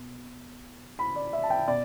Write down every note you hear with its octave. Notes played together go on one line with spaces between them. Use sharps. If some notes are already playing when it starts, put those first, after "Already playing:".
Already playing: B2
B5
D5
E5
A5
G5
B2 D5